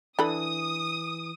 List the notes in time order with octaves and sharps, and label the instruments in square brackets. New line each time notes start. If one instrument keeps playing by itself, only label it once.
[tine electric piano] E3 [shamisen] D4 A4 B5 [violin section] D#6